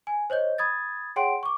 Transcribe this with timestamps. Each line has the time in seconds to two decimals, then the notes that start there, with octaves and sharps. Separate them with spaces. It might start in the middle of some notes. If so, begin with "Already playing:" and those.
0.07 G#5
0.30 C5 C#5 D#5 G6
0.58 B5 D#6 G#6 A6
1.16 G#4 C#5 F#5 G5 C6 D7
1.43 C#6 D6